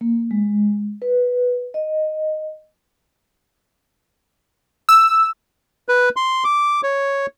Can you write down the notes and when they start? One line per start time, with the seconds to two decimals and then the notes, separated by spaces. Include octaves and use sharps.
0.01 A#3
0.31 G#3
1.02 B4
1.74 D#5
4.89 E6
5.89 B4
6.16 C6
6.44 D6
6.83 C#5